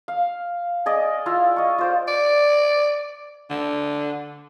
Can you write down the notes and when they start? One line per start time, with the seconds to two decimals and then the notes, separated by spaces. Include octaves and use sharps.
0.08 F5
0.86 G#4 D5 D#5
1.26 E4 F4 E5 F5
1.56 D#5 C#6
1.78 F4 C5 D5
2.08 D5
3.50 D3